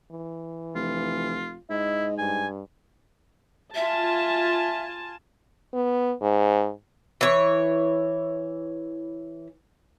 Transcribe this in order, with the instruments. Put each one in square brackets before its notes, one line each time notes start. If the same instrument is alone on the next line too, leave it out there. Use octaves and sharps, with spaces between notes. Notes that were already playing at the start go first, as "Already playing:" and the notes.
[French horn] E3
[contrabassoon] F1 [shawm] F4
[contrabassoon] G#2 [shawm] E4 [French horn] D#5
[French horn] G2 [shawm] G#5
[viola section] F4 G#5 A5 [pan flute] E5
[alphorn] B3
G#2
[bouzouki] E3 C#5